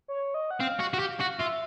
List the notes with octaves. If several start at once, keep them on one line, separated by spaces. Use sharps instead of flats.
C#5
D#5
F#5
C4 F5
F#4
F#4
G4
F#4
F4 E5